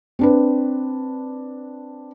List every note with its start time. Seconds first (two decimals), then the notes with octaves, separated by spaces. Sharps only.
0.19 C4 D4 B4